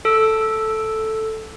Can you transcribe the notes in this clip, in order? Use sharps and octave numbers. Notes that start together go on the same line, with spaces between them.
A4 E6